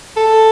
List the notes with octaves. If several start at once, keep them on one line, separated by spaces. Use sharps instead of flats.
A4